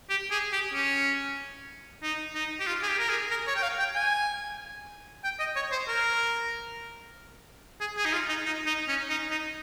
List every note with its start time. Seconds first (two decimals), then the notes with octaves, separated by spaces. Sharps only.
0.10 G4
0.31 G#4
0.52 G4
0.74 C#4
2.03 D#4
2.35 D#4
2.60 G4
2.67 F4
2.83 G#4
2.88 G4
2.99 A#4
3.09 G#4
3.31 A#4
3.47 C#5
3.56 G5
3.63 F5
3.79 G5
3.95 G#5
5.24 G5
5.40 D#5
5.56 C#5
5.72 C5
5.88 A#4
7.81 G#4
7.97 G#4
8.06 D#4
8.13 F4
8.29 D#4
8.45 D#4
8.66 D#4
8.88 C#4
9.10 D#4
9.31 D#4